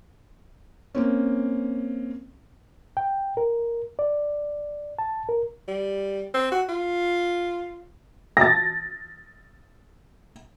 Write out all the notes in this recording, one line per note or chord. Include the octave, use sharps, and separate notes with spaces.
A#3 C4 C#4
G5
A#4
D5
A5
A#4
G3
C4
F#4
F4
A6 A#6